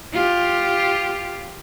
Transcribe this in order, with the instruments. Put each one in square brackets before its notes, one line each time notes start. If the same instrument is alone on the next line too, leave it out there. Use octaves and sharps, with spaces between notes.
[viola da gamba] F4 G4